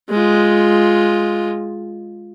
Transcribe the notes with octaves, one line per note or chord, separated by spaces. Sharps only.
G#3 F4